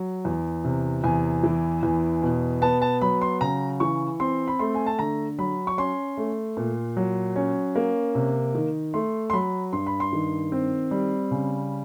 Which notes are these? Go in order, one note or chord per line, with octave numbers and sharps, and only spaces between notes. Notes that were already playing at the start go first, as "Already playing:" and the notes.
Already playing: F#3
E2
C3
E2 G#5
E3
E2
B2
B3 A5
A5
F#3 B5
C6
C#3 A#5
E3 C#6
C4 C6
B5
A3 C6
G#5
A5
D3 A#5
F#3 B5
C#6
C#4 C6
A3
A#2
F#3
C#4
A#3
C3
D#3
A3 C6
C6
F#3 B5
G2 C6
B5
C6
D#3
C4
G3
C#3